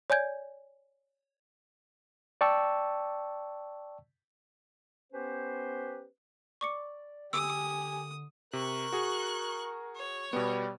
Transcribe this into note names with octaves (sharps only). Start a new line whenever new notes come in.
C#5 D5 G#5 G6 G#6
D5 G5 A5 C#6 E6
B3 C#4 G4 B4 C5
D5 C#6 D6 C#7
D3 G4 G#5 D#6 E6
C3 A#4 C#6 F#6
F#4 G#4
C#5
B2 G3 B3